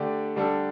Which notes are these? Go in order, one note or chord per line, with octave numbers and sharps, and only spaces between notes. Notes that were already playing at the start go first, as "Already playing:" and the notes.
Already playing: D3 A3 D4 G4 D5
D3 G3 D4 A4